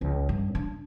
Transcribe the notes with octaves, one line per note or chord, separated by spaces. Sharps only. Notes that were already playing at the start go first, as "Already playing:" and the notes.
C#2
G2
D4